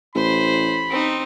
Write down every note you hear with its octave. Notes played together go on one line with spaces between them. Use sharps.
A1 C5 B5
C4 D#4